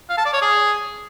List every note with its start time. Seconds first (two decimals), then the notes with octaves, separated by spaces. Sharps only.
0.09 F5
0.17 A5
0.25 D5
0.33 C#5
0.41 G#4